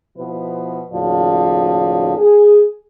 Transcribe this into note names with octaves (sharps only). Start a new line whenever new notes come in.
B2 F3 E4 B4
D#2 A2 C#3 F3 F#4 D5
G#4